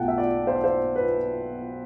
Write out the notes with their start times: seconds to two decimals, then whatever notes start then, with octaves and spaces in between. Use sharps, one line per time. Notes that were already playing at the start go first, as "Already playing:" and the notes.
Already playing: B1 B2 A3 F#5 G5 A5
0.08 E5
0.18 D5
0.47 C5
0.56 D5
0.64 C5
0.96 B4